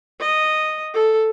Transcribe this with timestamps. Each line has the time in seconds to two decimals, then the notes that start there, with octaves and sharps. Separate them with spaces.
0.20 D#5
0.94 A4